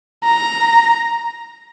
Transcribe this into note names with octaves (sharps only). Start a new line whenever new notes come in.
A#5